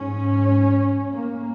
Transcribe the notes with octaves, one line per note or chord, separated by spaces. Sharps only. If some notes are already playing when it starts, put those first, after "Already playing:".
Already playing: G#2 C#4
A#3